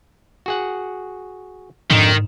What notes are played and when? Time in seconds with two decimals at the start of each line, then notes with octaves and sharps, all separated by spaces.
0.46 F#4 G#4 F#5
1.91 F2 G#2 D3 D#3 D#4